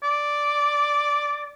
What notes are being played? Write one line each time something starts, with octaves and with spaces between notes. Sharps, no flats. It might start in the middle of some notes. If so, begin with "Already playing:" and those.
D5